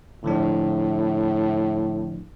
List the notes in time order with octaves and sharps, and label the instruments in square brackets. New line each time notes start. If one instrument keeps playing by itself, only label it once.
[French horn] A2 [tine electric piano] D3 F3 D4